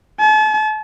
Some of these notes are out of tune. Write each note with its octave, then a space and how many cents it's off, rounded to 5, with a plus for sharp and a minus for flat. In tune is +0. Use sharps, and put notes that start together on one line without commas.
A5 -40